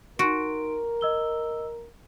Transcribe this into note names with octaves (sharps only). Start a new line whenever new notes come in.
D#4 F#4 A#4 C6 D7
D#5 E6 G7